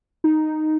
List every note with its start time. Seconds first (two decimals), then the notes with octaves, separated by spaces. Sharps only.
0.24 D#4